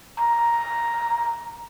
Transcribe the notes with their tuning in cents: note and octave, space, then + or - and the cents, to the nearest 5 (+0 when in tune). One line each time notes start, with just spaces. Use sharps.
A#5 +5